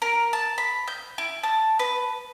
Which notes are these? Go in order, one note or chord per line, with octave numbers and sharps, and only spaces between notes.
A#4
A5
B5
G6
E4
A5
B4